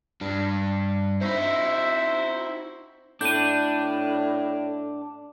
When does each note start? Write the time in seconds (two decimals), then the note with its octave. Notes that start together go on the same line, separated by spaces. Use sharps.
0.21 G2 D4
1.22 C4 D#4 E4 F#4 C5 E5
3.21 A2 D4 G6 D#7